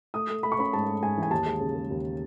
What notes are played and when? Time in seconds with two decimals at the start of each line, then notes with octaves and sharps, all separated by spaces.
0.14 A3 D#6
0.29 A3
0.43 A3 B5
0.52 C#6
0.59 C#4 B5
0.73 G#2 A5
0.87 G#2
1.02 G#2 G#5
1.17 E3
1.23 G#5
1.31 D#2 A5
1.46 G#3
1.60 C#3
1.76 G#3
1.90 D#2